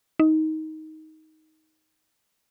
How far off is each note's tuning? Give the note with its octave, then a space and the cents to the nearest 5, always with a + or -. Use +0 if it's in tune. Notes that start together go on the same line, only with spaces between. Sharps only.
D#4 +15